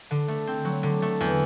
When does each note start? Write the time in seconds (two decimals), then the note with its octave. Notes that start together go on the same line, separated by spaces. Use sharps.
0.11 D3
0.28 A3
0.47 C4
0.65 F#3
0.83 D3
1.02 A3
1.20 E2